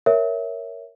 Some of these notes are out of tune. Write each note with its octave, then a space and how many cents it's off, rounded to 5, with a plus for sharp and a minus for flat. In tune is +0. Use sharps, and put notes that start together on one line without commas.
A#4 +0 C#5 +0 E5 +0